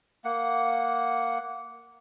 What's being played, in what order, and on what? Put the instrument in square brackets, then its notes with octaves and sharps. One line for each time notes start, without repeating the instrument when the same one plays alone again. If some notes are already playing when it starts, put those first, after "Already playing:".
[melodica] A#3 F#5